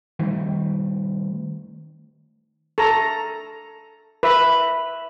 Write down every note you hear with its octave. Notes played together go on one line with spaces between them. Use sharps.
D#3 G3 A3
A4 A#5
B4 E5